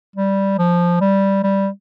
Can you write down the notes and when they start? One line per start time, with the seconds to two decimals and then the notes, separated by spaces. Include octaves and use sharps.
0.16 G3
0.59 F3
1.01 G3
1.44 G3